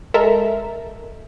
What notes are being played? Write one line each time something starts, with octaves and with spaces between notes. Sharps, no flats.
G#3 A4 A#4 E5